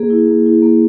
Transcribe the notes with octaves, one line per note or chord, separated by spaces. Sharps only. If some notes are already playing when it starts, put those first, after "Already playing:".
Already playing: A#3 G#4
E4
A#3
E4
A#3